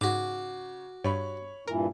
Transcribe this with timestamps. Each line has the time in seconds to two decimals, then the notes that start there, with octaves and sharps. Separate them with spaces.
0.01 G#2 C#3 F#4 D6 A#6
1.04 G2 C#5 B5 C#6
1.68 G2 A#2 E3 A#4